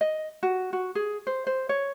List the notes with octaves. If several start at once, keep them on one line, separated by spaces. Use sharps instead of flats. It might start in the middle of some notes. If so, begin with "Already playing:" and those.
D#5
F#4
F#4
G#4
C5
C5
C#5